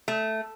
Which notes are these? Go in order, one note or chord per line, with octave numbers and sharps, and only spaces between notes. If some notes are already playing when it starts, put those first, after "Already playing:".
A3